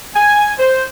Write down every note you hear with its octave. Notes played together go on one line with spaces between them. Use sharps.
G#5
C5